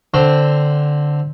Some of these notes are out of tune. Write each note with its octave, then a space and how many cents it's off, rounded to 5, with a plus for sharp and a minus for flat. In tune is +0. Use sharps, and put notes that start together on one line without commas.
D3 +0 C4 +0